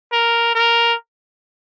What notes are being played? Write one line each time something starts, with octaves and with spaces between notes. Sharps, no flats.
A#4
A#4